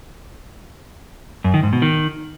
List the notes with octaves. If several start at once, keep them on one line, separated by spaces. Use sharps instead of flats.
F#2
D#3
G#2
B2
D#3